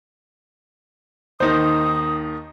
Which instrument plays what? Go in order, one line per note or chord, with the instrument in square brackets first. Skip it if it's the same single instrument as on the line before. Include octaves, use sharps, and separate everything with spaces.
[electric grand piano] D#2 D#3 [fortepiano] D#4 C5 [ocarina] D#6